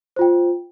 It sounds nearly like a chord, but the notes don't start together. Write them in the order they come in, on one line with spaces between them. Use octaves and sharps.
C5 F4 G5